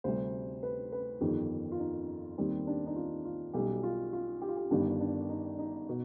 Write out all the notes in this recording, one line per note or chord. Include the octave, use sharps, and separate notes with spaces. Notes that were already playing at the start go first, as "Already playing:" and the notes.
D2 C3 G3 C5
B4
B4
G1 F2 D#3 G4
F4
D#4
D#2 D#3 G3 C4
D4
D#4
F4
F4
B1 B2 G3 G4
F4
F4
G4
F4
G4
G1 G2 D#3 G3 D4
D4
D#4
D#4
B2